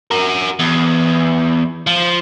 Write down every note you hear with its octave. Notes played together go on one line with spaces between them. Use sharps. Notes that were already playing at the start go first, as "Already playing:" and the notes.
F#4 A#4
E2
F3